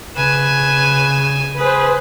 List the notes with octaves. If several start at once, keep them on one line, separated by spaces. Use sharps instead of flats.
C#3 B4 G#5 E7
G#4 B4 C5